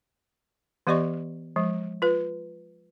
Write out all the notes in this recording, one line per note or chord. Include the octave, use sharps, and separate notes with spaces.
E3 B3 G4 D5 D#5 C#6
F3 G#3
F4 B4